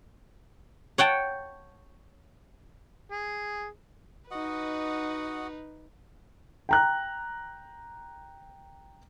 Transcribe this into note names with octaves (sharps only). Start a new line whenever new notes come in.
C#5 F#5 G5 A5
G#4
D#4 F#4 B4 D#5 F#5
G5 A#5 F#6